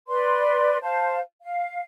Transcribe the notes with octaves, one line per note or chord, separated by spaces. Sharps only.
B4 D5 C6
C5 F5 A5
F5